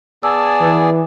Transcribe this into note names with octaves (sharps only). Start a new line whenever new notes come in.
B3 G#4 D5 G#5 A5 E6
E3 B4 E6